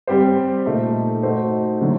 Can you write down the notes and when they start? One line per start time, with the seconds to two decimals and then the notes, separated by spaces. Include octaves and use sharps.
0.07 G3 C4 G4 C5
0.66 A#2 A3 D#4
1.23 A3 D#4 F#4 C5
1.81 D3 F#3 A3 D4